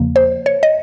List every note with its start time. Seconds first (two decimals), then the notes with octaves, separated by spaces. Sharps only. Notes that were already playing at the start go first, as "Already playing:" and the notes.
Already playing: E2 C#3 F3 A#3
0.16 C5
0.46 C#5
0.63 D#5